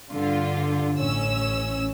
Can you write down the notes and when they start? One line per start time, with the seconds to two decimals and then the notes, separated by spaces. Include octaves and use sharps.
0.10 G2 D3 F4
0.97 A1 C#4 E6